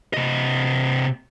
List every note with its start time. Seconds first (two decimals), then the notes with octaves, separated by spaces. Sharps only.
0.14 C3 D#5